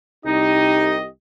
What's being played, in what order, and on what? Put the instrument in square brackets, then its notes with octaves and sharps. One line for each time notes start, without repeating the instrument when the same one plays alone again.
[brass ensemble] C2 G4 D#5 [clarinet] D#4